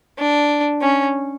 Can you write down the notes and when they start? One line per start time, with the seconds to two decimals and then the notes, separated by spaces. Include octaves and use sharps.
0.19 D4
0.82 C#4